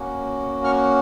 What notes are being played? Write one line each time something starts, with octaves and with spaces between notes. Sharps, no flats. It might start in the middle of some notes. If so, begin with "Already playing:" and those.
Already playing: A#3 C#4 F#4
C#6 F6